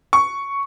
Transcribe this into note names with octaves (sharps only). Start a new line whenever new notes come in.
C#6